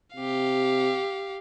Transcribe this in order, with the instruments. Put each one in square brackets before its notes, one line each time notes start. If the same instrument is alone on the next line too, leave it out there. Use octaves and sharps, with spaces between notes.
[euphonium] C3 [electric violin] G4 F5